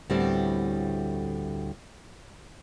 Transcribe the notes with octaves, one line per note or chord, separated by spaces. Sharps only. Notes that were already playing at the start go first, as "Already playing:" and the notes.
D2 A2 G3 B3 C4